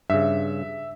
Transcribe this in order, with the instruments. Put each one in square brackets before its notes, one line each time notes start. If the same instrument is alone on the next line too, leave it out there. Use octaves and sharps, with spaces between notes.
[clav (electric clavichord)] G2 C#3 [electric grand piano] E5